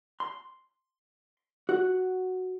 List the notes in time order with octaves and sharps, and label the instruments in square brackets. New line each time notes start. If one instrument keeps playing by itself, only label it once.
[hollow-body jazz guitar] C6
F#4